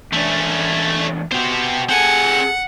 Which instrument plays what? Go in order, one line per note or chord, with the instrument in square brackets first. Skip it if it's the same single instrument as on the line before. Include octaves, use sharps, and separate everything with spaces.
[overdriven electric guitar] E2 D4 [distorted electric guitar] A3 C#4
[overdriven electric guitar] B2 F#4 [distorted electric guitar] G4 C5
[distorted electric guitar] C4 G#5 [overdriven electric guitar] G#4 A4 [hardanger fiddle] F#5